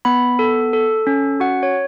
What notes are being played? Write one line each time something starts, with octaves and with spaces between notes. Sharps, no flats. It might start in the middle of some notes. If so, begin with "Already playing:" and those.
B3 B5
A4
A4
C#4
F#4 F#5
C#5